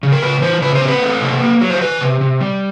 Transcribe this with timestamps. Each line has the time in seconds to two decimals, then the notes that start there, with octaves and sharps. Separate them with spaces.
0.03 C#3
0.12 A#4
0.22 C#3 B4
0.42 E3 C5
0.62 C#3 B4
0.75 C5
0.82 C4
0.88 B4
1.02 A3
1.21 C3
1.42 A#3
1.61 F#3
1.70 C5
1.81 D#3 B4
2.01 C3
2.21 C3
2.40 G3